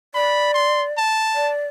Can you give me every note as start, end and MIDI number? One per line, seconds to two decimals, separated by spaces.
0.15 0.93 74
0.15 0.50 83
0.54 0.84 84
0.98 1.51 81
1.35 1.67 74